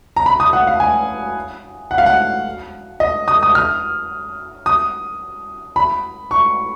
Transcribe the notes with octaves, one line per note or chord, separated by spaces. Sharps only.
A#5
B5
D#6
F#5
F5
G#5
F#5
F5
F#5
D#5
D#6
D#6
F6
D#6
B5
C#6